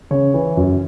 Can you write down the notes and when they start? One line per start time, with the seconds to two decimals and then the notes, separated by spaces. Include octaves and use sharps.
0.11 C#3 C#5
0.34 E3
0.57 F#2